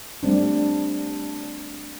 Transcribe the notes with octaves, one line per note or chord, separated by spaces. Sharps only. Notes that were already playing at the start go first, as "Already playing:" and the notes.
G3 A3 C4 D4